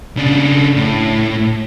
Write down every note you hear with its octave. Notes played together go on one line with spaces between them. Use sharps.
C#3 D4
A2